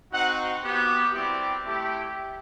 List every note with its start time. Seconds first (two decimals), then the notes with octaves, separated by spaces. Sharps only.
0.12 C4 D#4 F#4 F#5
0.63 B3 F#4 G4
1.14 G3 C4 E4 G4
1.65 A3 E4 G4